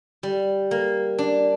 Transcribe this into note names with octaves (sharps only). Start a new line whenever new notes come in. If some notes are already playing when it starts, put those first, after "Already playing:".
G3
A#3
D4